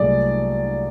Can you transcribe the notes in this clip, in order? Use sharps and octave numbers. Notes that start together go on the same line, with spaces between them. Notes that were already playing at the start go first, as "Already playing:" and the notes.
Already playing: C2 A#2 F#3 A3 G#4 D5